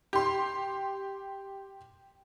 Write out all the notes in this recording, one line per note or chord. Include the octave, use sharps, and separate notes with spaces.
G4 C6